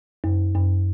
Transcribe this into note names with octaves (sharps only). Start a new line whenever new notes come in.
F#2
F#2